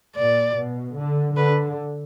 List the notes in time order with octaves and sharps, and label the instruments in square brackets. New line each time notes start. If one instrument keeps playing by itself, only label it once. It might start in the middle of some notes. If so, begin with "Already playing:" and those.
[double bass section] A#2 [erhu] D5
[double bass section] B2
D3
[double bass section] D3 [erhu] B4